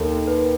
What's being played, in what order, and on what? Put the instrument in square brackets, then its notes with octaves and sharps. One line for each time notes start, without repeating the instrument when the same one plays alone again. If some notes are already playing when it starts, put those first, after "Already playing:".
Already playing: [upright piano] D#2 [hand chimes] A4
[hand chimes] B4